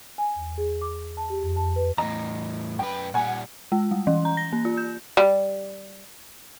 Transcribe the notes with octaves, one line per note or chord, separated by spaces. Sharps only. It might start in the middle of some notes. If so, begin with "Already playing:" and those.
G#5
E2
G#4
D6
A5
G4
F2
A5
B4
E2 A2 D#5 A#5
F#2 B4 G5
A#2 G3 F#5 G#5
G#3
G3
E3
A#5
A#6
A#3
F4
G6
G3